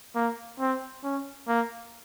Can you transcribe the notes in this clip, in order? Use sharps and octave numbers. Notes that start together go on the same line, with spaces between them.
A#3
C4
C#4
A#3